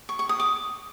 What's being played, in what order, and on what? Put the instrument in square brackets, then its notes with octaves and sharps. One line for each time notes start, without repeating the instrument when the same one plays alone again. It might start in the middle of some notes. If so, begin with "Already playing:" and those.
[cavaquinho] C#6
C#6
D#6
D6